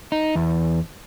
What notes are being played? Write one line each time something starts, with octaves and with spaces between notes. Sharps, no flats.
D#4
E2